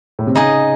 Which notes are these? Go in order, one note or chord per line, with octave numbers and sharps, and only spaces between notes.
A2
C3
C#3 D#4 G#4 D#5